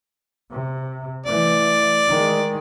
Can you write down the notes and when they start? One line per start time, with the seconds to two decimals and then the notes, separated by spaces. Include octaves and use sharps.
0.52 C3
1.26 E3 A3 D5
2.08 D#3 G#3